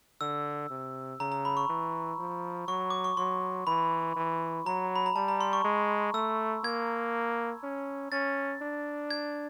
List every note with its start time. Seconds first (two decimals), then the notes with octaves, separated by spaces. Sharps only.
0.21 D3 E6
0.70 C3
1.20 C#3 A#5
1.32 A#5
1.45 B5
1.57 C#6
1.69 E3
2.19 F3
2.68 F#3 C#6
2.90 D6
3.04 C#6
3.17 F#3 C6
3.67 E3 B5
4.16 E3
4.66 F#3 A#5
4.96 B5
5.06 A#5
5.15 G3 A5
5.28 A#5
5.41 C6
5.53 C#6
5.64 G#3
6.14 A3 E6
6.64 A#3 G#6
7.63 C#4
8.12 C#4 A6
8.62 D4
9.11 G#6